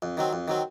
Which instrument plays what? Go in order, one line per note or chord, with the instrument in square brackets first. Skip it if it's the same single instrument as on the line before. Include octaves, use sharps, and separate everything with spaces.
[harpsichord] F2
D#3 F#3 C4
F2
D#3 F#3 C4